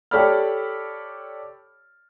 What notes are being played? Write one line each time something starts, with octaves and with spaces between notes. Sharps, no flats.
G4 A4 C#5 D5 B5 F6